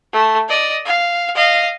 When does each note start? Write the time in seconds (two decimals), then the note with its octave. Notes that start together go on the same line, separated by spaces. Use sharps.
0.13 A3
0.49 D5 D#5
0.85 F5
1.35 D#5 F5